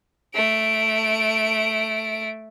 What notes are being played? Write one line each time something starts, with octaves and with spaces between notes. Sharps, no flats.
A3 D7